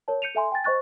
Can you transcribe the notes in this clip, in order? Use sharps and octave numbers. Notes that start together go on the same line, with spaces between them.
A#4 C#5 A5
G6 C#7 D#7 F7
A4 E5 G#5 C6
G5 G#5 A6
C5 D#5 C#6 F#6 A6